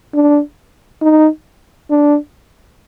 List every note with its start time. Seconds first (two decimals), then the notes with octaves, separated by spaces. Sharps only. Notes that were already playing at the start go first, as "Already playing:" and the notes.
0.14 D4
1.01 D#4
1.90 D4